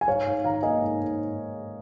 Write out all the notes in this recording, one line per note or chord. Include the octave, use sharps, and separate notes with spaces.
G#5
G#2 C#5 F5
G#2
D#3 F5 A#5
A#3 D#5 G#5
G#2
G#2